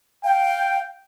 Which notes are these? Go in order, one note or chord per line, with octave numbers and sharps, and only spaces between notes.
F5 G5